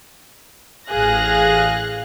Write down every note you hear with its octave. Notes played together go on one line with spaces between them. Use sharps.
A1 G#4 F5 F#6 A#6